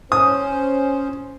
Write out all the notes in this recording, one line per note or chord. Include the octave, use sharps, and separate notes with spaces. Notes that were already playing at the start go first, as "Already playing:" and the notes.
C#4 C5 D#6